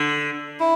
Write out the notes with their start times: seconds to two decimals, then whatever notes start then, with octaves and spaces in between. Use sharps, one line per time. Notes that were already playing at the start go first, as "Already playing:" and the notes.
Already playing: D3
0.60 E4